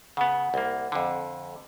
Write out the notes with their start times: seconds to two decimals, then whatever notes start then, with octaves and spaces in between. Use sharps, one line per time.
0.17 C#3 B3 F#5
0.54 C2 A#3
0.92 F2 D3